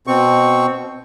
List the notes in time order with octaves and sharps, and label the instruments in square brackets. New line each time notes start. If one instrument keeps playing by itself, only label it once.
[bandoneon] B2 C4 C#6